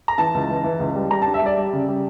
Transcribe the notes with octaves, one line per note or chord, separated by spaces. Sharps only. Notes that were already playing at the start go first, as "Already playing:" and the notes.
A#5
E3 A5
C#2
E3
E3
C#2
G3
G3 A#5
A5
D4
E5
G3 D5
G3
C#3
G3